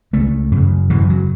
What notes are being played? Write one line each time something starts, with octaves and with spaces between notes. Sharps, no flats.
C#2 C#3 A3
F#2 C#3
F#2 C#3 E3
F#3